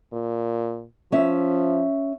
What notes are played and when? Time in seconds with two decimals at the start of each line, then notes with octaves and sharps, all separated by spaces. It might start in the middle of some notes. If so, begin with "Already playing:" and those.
0.13 A#2
1.12 F3 C#4 E5